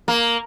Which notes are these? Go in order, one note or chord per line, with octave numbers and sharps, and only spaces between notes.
A#3